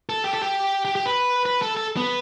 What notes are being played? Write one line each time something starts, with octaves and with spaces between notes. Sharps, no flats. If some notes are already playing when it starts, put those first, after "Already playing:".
A4
G4
A4
G4
G4
G4
B4
B4
A4
A4
B3